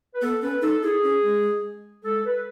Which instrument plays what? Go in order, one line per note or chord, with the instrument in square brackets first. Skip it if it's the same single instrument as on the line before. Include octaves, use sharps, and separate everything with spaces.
[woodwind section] B4
[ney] B3 [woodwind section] A4
[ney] C#4 [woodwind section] B4
[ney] D#4 [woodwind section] A4
[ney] E4 [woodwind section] G#4
[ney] C#4
G#3
[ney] G#3 [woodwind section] A4
[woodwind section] B4